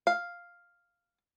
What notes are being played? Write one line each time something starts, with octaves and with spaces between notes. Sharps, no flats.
F5